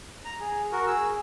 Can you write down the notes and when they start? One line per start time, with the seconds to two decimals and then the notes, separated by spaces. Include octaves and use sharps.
0.25 A#5
0.40 G#4
0.72 F#4 A#4
0.87 G#4 E6